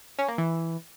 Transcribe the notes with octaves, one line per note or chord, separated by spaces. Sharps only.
C#4
A#3
E3